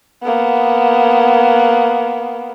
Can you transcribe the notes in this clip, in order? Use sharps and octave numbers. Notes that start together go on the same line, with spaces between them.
A#3 B3